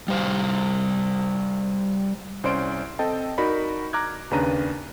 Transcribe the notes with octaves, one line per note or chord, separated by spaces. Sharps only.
G3 C5 F5
C2 C#4 C5 D5 C6 D7
C4 A4 D#5 G5 A5
D#4 F#4 A#4 D5 B5
A#5 D6 F6 F#6 G#6
D#2 C#3 D4 B4 A#5 D#7